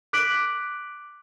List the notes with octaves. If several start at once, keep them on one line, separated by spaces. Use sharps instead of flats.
D6 F#6 B6 D7 F#7